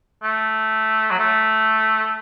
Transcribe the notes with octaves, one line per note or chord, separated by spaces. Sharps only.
A3
F#3
A3